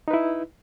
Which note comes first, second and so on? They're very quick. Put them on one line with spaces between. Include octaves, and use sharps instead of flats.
D#4 B4 E4